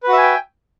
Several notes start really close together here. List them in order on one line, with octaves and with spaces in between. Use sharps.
B4 F#4 E5 G#5 G5